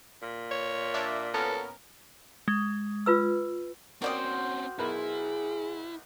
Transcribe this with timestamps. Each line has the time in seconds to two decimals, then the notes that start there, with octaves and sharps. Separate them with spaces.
0.22 A#2
0.51 C#5
0.94 D4 D5 E5
1.34 B3 C#4 A4 A#4
2.48 G#3
3.06 F4 B4 E6
4.02 C4 C#4 F#4 A#4 C5 D5 G5 D#6
4.79 B1 E4 G#4 A#4 B4